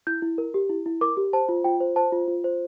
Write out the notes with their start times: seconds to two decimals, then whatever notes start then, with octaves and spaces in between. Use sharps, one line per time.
0.07 E4 G6
0.22 E4
0.38 A#4
0.54 G4
0.70 E4
0.86 E4
1.01 A#4 D6
1.17 G4
1.33 C5 A5
1.49 F4
1.64 F4 G5
1.80 C5
1.96 C5 A5
2.12 F4
2.28 F4
2.44 C5